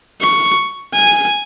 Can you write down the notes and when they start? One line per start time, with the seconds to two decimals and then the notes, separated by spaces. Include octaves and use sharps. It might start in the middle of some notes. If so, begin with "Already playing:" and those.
0.21 C#6
0.94 G#5